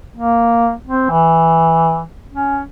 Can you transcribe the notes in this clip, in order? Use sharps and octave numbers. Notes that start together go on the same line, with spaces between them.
A#3
C4
E3
C#4